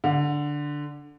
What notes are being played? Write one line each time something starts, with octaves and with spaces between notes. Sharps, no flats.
D3